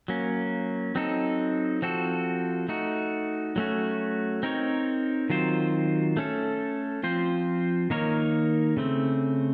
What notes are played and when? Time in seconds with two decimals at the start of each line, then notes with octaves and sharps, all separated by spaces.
0.08 F#3 A#3 C#4
0.95 F#3 C4 D#4 A4
1.82 F3 C4 F#4 A4
2.68 A3 D#4 F#4
3.56 F#3 A3 C#4 F#4
4.43 C4 D#4 A#4 C#5
5.30 D#3 F#3 C4 F4 C5
6.17 A3 C#4 A4
7.03 F3 C4 F4 C5
7.90 D#3 A#3 D#4 A#4 C#5
8.77 C#3 A3 C4